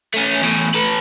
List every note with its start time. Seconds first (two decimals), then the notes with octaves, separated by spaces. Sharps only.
0.14 A3 C#4
0.42 E2 A2
0.75 A4 B4